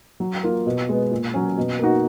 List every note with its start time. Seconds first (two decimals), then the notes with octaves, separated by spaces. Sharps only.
0.20 F#3
0.43 A#3 F4
0.66 B2
0.89 G#3 B3
1.11 A#2
1.34 F#3 C#4
1.58 B2
1.79 A#3 D#4 F#4